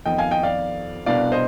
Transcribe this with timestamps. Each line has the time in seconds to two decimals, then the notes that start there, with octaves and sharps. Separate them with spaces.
0.06 F2 D#3 B3 D#5 G5
0.18 F5 G#5
0.31 D#5 G5
0.43 D5 F5
1.06 C2 B2 B3 D4 D5 F5
1.32 C5 D#5